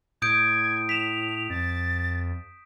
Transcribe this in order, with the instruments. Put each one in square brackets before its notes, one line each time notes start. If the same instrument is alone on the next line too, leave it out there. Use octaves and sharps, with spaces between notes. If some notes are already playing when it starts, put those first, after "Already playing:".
[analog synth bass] A2 [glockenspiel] D#6 G6 D7 [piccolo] G#6
[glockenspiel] B6 E7 [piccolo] F7
[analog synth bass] F2 [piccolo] A6